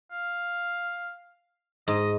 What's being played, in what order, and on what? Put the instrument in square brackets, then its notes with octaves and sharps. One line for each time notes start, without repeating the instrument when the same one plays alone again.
[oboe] F5
[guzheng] G#2 [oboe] D#5